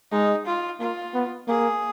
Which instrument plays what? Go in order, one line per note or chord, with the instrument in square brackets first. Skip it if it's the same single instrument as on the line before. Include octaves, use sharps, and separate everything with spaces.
[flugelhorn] G#3 [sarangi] D#4
[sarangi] F4
[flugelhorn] A#3 [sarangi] F4
[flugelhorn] B3
[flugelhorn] A#3 [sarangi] G#4